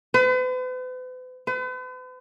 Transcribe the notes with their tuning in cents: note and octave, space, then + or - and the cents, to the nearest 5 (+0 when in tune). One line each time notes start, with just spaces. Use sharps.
B4 +45
B4 +45